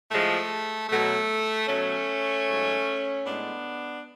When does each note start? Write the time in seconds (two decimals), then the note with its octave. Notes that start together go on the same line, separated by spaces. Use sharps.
0.10 A2 F3 G#3 A3
0.88 B2 F#3 A3
1.67 B2 F#3 A3 C#4
2.46 G#2 F#3
3.25 A2 G#3 B3 D4